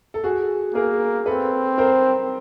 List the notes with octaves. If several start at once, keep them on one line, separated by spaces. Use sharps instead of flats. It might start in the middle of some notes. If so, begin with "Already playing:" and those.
A4
F#4 G#4
A#3 G#4 A#4
C4 A4 B4
A#4 C5